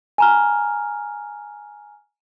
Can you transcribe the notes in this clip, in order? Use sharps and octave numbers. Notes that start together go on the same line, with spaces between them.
G#5 A#5 F6